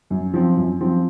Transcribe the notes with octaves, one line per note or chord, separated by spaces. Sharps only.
F#2
F3 C4
F#2
F3 C4